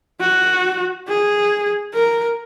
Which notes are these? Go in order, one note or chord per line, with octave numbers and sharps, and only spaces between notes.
F#4
G#4
A#4